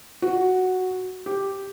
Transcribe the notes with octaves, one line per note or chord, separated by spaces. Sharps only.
F#4
G4